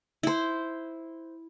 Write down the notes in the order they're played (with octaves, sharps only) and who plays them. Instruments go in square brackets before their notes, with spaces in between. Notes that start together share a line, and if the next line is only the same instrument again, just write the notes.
[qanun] E4 C5